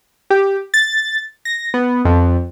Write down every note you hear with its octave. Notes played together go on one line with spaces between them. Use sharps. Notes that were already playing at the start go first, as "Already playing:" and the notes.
G4
A6
A#6
B3
F2